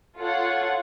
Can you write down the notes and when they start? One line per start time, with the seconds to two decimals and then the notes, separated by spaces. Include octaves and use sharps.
0.16 F4 A4 C#5 F#5